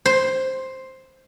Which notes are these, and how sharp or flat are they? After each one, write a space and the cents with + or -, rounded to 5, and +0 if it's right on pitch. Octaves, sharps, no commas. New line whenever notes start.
C5 +5